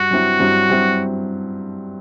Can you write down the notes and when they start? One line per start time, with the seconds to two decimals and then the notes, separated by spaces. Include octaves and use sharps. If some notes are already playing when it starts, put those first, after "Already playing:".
Already playing: G2 F#4
0.11 G2 F#3 C4 E4
0.40 G2 F#3 C4 E4
0.69 G2 F#3 C4 E4